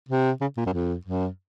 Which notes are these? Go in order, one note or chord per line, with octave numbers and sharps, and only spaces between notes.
C3
C#3
A#2
F#2
F2
F#2